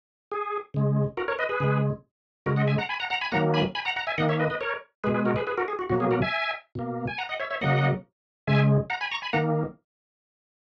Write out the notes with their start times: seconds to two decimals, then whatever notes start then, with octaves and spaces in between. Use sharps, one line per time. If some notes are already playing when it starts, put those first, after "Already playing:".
0.32 G#4
0.74 C#3 G#3
1.17 F#4 A#4
1.28 A#4 C#5
1.39 B4 D#5
1.49 G#4 B4
1.60 C#3 G#3
2.46 C#3 G#3 F#4 A#4
2.56 D#5 F#5
2.67 E5 G#5
2.78 F#5 A#5
2.89 G#5 B5
3.00 F#5 A#5
3.10 F#5 A#5
3.21 G#5 B5
3.32 D#3 F#3 A#3 F#5 A#5
3.54 G#5 B5
3.75 G#5 B5
3.85 F#5 A#5
3.96 F#5 A#5
4.07 E5 G#5
4.18 D#3 A#3 D#5 F#5
4.29 C#5 E5
4.39 B4 D#5
4.50 B4 D#5
4.61 A#4 C#5
5.04 B2 G#3 G#4 B4
5.14 G#4 B4
5.25 F#4 A#4
5.36 G#4 B4
5.47 G#4 B4
5.58 F#4 A#4
5.68 G#4
5.79 F#4
5.89 B2 F#3 A#3 F#4
6.00 G#4
6.11 F#4 A#4
6.22 E5 G#5
6.75 B2 A#3
7.07 G#5
7.18 F#5 A#5
7.29 D#5 F#5
7.40 C#5 E5
7.50 C#5 E5
7.61 C#3 F#3 A#3 D#5 F#5
8.47 C#3 G#3 E5 G#5
8.90 F#5 A#5
9.01 G#5 B5
9.11 A#5 C#6
9.22 G#5 B5
9.33 D#3 A#3 F#5 A#5